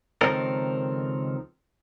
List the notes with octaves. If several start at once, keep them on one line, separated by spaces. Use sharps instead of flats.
C#2 D#3 F3 C4 A4 A#4